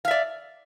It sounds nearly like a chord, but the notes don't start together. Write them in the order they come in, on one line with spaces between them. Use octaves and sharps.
F5 E5 D5